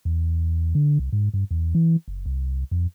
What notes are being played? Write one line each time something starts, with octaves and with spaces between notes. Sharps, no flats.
E2
D3
C2
G#2
G2
E2
E3
F#1
C2
F2